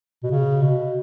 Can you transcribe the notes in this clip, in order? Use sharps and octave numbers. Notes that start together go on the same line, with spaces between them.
B2
C#3
B2